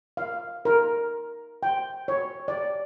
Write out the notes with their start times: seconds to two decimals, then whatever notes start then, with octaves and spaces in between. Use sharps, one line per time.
0.17 F5
0.65 A#4
1.63 G5
2.08 C#5
2.48 D5